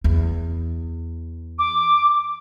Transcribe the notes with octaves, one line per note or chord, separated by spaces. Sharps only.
E2
D6